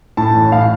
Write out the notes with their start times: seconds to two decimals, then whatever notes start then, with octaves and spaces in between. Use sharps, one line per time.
0.17 A2 A5
0.35 A1
0.52 A2 F5